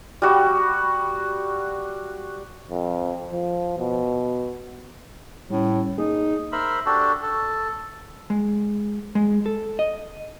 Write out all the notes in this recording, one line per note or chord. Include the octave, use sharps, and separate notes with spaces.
G3 F#4
F2
F3
B2
A2 G3 C#4
A#3 D#4 G#4
A#4 C5 E5 B5
D4 F#4 G4 A4
A4
G#3
G#3
A4
D#5